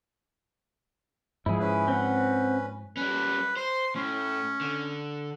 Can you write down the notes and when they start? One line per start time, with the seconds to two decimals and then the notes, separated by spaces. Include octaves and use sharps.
1.46 G#2 F3 E4 G#4
1.60 C#4 B4
1.88 C4 F#5
2.97 G3 C#4 B4
3.57 C5 C6
3.96 A2 C#4
4.61 D3